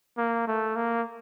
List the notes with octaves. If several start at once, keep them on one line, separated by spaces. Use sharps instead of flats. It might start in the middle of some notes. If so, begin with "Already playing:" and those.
A#3
A3
A#3